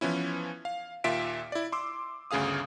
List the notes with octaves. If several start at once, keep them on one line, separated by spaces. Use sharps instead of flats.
E3 F3 B3 C#4 E4
F5
D#2 A#2 F4 E5 B6 D7
E4 D5
C6 D6 E6
G1 D2 C#3 G#4 F5 D#6